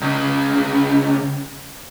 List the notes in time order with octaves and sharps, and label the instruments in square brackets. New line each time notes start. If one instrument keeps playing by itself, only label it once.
[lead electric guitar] C#2 C#3